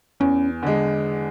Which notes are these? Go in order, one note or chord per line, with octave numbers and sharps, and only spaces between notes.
E2 C#4
D3 G#3